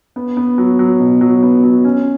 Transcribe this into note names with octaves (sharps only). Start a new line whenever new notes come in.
B3
B3
F#3
F#3
B2
F#3
B3
F#3
C#4